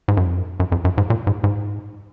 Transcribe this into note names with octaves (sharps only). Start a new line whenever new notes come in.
G#2
F#2
F2
F#2
F#2
F2
F#2
G#2
A#2
G#2
G#2